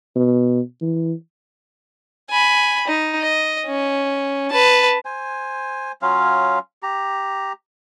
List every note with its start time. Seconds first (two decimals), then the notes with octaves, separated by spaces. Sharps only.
0.16 B2
0.82 E3
2.31 G#5 B5
2.87 D#4
3.22 D#5
3.66 C#4
4.51 B4 A5
5.05 C5 G#5
6.02 F#3 C#4 F4 F5
6.83 G4 A#5